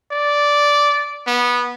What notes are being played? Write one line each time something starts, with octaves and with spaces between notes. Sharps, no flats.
D5
B3